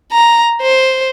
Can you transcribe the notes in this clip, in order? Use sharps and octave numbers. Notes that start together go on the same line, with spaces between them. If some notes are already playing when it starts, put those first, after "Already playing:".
A#5
C5